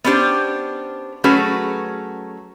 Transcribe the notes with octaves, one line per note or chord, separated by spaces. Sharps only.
B3 C#4 D4 G4 C5
F#3 A3 C#4 F#4 G#4 B4